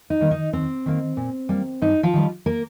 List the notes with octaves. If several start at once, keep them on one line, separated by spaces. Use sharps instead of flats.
D#4
D#3 G3 A#3
D#4
D#2 C4
D#3 A#3
A#2
G3 A#3
G2 D#4
F3 F4
D#3 G3
A#3 A#4